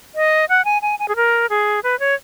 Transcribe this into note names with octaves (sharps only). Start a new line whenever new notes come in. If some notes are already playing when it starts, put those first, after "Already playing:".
D#5
F#5
G#5
G#5
G#5
G#4
A#4
G#4
B4
C#5